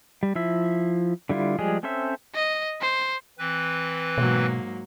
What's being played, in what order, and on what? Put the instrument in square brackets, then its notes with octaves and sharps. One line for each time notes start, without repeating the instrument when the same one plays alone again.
[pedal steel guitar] G3
F3 E4 E5
D3 G3 E4 F4
F3 G3 G#3 G#4
C4 C#4 A4 C5 E5
[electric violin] D#5
C5
[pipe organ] E3 C4 B4
[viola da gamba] G#2 F#3 A#3 [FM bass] B2